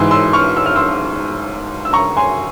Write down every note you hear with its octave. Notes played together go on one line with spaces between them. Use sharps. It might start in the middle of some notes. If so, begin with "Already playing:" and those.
Already playing: G#2 E3 C6 E6
C6 E6
C#6 F6
E6
F6
C6 E6
E6
A#5 C#6
G#5 C6